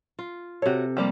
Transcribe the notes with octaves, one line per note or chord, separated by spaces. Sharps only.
F4
C3 F#4 A4 C#5
F3 G3 A#3